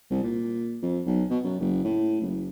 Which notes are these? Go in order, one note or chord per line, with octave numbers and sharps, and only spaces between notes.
C2
A#2
F2
B1
B2
F#2
F#1
A2
F#1